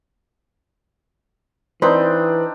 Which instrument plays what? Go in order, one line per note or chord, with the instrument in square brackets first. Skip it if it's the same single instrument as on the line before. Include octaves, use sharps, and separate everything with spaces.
[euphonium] E3 [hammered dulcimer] C4 D4 D#4 [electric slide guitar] B4 [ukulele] C5